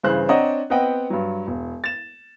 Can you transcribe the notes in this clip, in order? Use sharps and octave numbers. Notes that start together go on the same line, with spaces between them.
G2 C#3 E3 C5 F#6
C4 D4 C#5 D#5 F#5 A#5
B3 C4 B4 D#5 F#5 G5
G2 F#3
E1
A6 E7